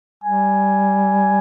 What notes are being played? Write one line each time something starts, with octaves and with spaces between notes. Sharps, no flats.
G3 G#5